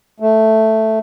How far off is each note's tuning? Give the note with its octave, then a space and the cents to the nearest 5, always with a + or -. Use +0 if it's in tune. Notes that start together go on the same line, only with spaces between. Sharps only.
A3 +0